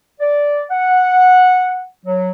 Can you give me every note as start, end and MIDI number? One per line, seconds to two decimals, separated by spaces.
0.20 0.64 74
0.71 1.86 78
2.06 2.32 54